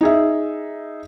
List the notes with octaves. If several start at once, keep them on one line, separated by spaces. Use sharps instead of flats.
D#4 G#4 E5